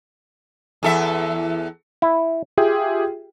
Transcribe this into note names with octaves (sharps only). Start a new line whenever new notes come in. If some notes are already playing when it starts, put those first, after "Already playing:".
E2 A4 E5
E4
F4 G4 G#4 E5 G5